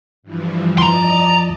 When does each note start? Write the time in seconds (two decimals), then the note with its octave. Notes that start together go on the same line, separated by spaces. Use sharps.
0.23 G2 E3 F3
0.78 F2 F3 D5 D#5 A5 A#5 C6